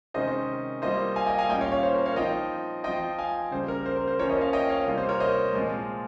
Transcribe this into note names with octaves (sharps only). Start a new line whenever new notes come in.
C3 D#3 G#3 C#4 C5 D#5
G3 A#3 F4 C5 D#5
F5 G#5
D#5 G5
F5 G#5
A#2 G3 C#4 F4 D#5 G5
C#5 F5
C#5 F5
C5
A#4
C#5 F5
F3 C4 D#4 D#5 G5
F3 C4 F4 D#5 G5
F5 G#5
C#3 G3 A#3 C5
A#4
C5
A#4
C5
F3 A#3 C#4 A#4 C#5
C5 D#5
C#5 F5
D#5 G5
C#5 F5
C3 G3 A#3 F4
C5
A#4 C#5
C5 D#5
A#2 F3 G#3 C4 F4